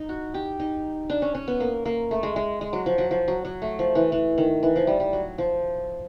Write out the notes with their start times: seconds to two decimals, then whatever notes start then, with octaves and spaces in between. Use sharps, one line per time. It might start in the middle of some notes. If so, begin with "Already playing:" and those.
Already playing: D#4
0.09 F#4
0.34 G4
0.60 D#4
1.10 D4
1.22 C#4
1.35 C#4
1.48 B3
1.60 A#3
1.85 A#3
2.11 A3
2.23 G#3
2.36 G#3
2.61 G#3
2.73 F#3
2.86 F3
2.98 F#3
3.11 F3
3.28 F#3
3.45 F#3
3.62 A3
3.79 F3
3.95 E3
4.12 E3
4.38 D#3
4.63 E3
4.76 F3
4.87 G3
5.00 G3
5.13 F#3
5.38 F3